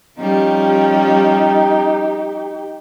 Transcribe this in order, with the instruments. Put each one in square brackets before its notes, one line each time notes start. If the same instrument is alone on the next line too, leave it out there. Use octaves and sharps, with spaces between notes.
[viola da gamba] F3 G3 C#4 [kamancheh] D#4 G4